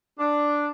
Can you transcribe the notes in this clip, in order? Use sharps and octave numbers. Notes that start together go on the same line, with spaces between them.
D4